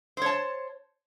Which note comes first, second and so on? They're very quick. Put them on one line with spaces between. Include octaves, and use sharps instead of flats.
C5 C#5 A5